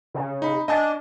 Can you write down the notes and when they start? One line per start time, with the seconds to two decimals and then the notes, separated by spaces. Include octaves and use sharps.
0.14 C#3
0.42 D#4 B5
0.68 D4 D#5 G#5 A5